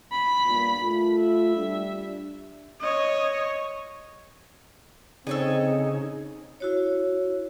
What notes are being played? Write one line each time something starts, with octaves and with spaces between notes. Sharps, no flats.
B5
G2 A#2 B3
A3 F4
E5
G3 D4
C#5 D#5
C#3 C4 D#4 G#4 A4 C#5 D#5
E4 F#4 C#5